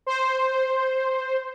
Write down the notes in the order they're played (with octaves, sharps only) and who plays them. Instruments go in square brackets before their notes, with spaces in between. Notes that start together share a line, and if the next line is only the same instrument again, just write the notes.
[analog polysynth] C5